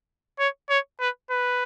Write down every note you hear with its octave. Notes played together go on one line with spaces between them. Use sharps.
C#5
C#5
B4
B4